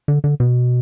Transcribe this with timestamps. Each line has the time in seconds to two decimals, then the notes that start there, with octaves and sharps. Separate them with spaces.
0.08 D3
0.24 D3
0.40 B2